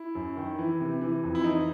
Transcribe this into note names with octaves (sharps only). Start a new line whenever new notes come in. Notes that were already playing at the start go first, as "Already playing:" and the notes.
Already playing: E4
F#2
D#3
E3
C3
E3
F2
E4
E3 D#4